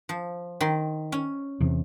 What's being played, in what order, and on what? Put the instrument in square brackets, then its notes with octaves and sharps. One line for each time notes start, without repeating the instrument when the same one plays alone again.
[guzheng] F3
D#3 C6
C#4
[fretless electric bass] E2 C3